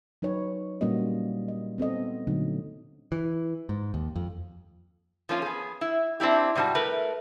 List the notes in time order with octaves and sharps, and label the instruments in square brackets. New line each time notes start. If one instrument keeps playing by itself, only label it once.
[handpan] F#3 D#4 B4 C#5
A#2 G3 A#3 C#4 F#4 D#5
D#5
B3 C4 A4 D#5
A#2 D3 F#3 A3 D#4
[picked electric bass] E3
G#2
D#2
F2
[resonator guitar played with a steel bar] F3 A#3 C#4 F4
B3 G#4
E4
C4 D4 E4 G4
G#2 C3 G3 F#4 A5
A3 A#4 B4